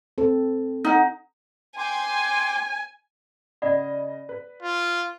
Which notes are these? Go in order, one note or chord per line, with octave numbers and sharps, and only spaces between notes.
C4 A4
D#4 F#5
G5 G#5 C6 D6
C#3 D5 D#5 F#5 B5
B4
F4